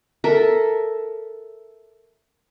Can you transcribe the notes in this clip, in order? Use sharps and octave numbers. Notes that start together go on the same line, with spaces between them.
A4 A#4 E5